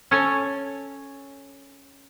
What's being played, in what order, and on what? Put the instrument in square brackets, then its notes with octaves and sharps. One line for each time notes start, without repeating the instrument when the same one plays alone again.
[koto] C#4 A4 C#5 G#5